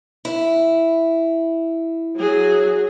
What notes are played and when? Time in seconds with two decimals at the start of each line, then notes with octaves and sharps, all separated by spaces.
0.25 E4
2.17 F#3 G#4